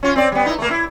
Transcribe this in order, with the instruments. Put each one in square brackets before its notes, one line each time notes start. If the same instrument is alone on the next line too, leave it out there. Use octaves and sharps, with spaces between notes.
[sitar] C#4 F4
C4 D5
G3 B3
D#4 E4
A3 A#3
E4